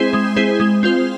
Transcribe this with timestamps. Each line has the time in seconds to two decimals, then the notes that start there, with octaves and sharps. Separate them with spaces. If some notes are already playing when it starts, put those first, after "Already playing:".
Already playing: G#3 C4 E4 G#4 C5
0.13 G#3
0.36 C4 E4 G#4 C5
0.60 G#3
0.83 C4 F4 C5